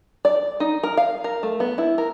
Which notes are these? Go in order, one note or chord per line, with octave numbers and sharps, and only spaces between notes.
D5
D#4
A#4
F5
A#4
A3
B3
E4
A#4